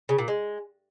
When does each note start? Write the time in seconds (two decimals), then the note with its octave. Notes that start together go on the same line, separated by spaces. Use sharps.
0.09 C#3
0.18 A#2
0.28 G#3